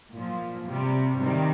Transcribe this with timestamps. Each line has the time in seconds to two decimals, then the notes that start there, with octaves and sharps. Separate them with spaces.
0.14 A#2 F3
0.67 C3 G3
1.19 C3 D#3 G3